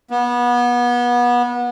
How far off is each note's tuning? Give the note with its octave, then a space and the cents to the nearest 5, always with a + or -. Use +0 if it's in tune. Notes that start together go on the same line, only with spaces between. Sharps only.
B3 -25